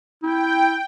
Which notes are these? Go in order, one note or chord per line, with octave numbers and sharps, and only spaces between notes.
E4 G5